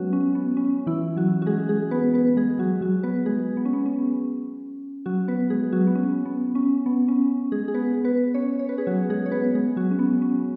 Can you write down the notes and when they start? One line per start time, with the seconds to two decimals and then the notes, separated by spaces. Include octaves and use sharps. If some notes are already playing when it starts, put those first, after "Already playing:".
Already playing: F#3 G#3 B3 C#4 F#4 B4 C#5
0.13 C#4
0.35 B3
0.57 C#4
0.87 E3 E4
1.16 F#3 F#4
1.42 F#4
1.46 G#3 G#4
1.69 G#3 G#4
1.91 B3 B4
2.14 B3 B4
2.37 G#3 G#4
2.59 F#3 F#4
2.81 F#3 F#4
3.03 B3 B4
3.26 G#3 G#4
3.57 B3
3.65 C#4
3.73 B3
3.86 C#4
5.06 F#3 F#4
5.28 B3 B4
5.50 G#3 G#4
5.72 F#3 F#4
5.87 B3
5.95 C#4
6.25 B3
6.55 C#4
6.86 B3
7.08 C#4
7.52 G#3 G#4
7.68 G#4
7.74 B3 B4
8.04 B3 B4
8.34 C#4 C#5
8.59 C#5
8.69 B4
8.78 G#4
8.87 F#3 F#4
9.10 G#3 G#4
9.26 C#5
9.32 B3 B4
9.55 G#3 G#4
9.76 F#3 F#4
9.91 C#4
9.99 B3
10.22 C#4